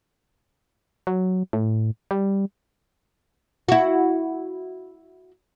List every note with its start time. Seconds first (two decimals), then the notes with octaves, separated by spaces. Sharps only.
1.07 F#3
1.53 A2
2.11 G3
3.68 E4 F#4